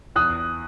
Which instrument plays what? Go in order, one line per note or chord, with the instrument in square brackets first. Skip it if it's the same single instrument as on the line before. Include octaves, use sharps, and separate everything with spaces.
[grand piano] E2 D#6 F#6